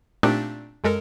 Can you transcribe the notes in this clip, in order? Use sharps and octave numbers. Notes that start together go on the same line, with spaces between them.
A#2 A3 C4 D4 D#4 G4
F#2 G#3 A4 A#4